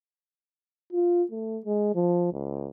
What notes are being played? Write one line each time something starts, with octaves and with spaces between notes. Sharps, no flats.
F4
A3
G#3
F3
C#2